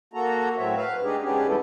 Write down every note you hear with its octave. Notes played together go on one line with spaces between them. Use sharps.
A#3 F#4 A4 A#5
A2 F#3 C4 C#5 E5
B4 F5
G#3 D4 D#4 G4 G#4
G#2 B3 C#4 D4 G4 G#4
E3 G3 G#3 E4 A4